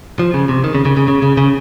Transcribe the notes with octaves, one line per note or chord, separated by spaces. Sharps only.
F3
C#3
C3
D#3
C#3
C#3
C#3
C#3
C#3
C#3